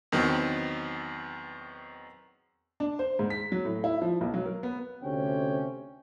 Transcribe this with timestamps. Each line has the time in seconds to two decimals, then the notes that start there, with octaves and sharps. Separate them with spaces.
0.12 E2 D#3 F#3 B3 C4
2.80 D4
2.99 C5
3.19 G#2
3.30 B6
3.52 F#3
3.65 A2
3.84 E4
4.02 F3
4.21 B1
4.34 F#3
4.46 A#4
4.63 B3
5.03 D2 C3 C#4 G5